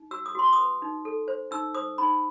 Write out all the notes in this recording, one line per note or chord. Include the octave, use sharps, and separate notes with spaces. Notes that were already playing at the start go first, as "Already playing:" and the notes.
Already playing: D#4
F#4 E6
D#6
F#4 C6
D#6
B4
D#4
A4
C5
D#4 E6
C5 D#6
D#4 B5